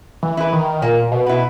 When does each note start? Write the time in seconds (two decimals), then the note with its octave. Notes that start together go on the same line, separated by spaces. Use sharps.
0.23 E3
0.37 E4 B4
0.53 D#3
0.82 A#2 A#3
1.12 B2
1.26 E4 B4